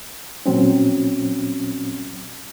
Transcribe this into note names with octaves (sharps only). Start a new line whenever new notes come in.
A#2 F#3 C4 C#4